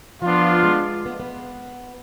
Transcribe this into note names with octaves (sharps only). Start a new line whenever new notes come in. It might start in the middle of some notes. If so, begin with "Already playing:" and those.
F3 B3 D4 F4
G#3
B3
B3